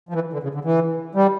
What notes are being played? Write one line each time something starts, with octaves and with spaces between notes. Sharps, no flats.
F3
E3
D3
C#3
D3
E3
G3